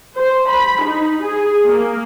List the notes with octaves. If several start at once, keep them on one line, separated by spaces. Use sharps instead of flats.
C5
B5
D#4
G#4
A#3